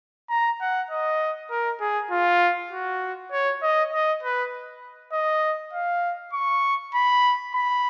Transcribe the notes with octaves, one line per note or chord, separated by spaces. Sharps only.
A#5
F#5
D#5
A#4
G#4
F4
F#4
C#5
D#5
D#5
B4
D#5
F5
C#6
B5
B5